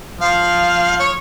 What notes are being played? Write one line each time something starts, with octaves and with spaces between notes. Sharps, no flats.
F3 F5
C#5